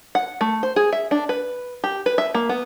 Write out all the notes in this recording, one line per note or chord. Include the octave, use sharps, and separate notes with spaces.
F#5
A3
C5
G#4
E5
D4
B4
G4
B4
E5
A#3
B3